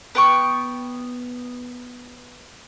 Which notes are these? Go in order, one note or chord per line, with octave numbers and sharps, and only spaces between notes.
B3 G5 C#6